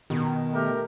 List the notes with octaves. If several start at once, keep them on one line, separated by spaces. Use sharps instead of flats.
B2 D#3
A3 G4 A#4